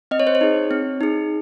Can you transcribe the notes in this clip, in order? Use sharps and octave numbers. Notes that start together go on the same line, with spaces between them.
C4 D#5
C#5
C5
C#5
D#4 G#4
C4
D#4 G#4